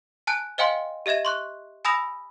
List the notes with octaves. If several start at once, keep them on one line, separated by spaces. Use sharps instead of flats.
G#5 A5 F#6 D7
C5 D#5 F5 G5 G#5 C6
G4 D#5 E5 G#6 E7
C6 C#6 F#6
G#5 B5 D#6 E6 A#6 F7